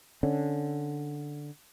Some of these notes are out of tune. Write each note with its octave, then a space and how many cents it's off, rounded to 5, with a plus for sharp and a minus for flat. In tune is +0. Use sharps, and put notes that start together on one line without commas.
D3 +0 C#4 +0